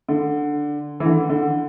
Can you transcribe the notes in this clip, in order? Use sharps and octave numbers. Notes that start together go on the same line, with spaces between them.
D3
E3
D3
D3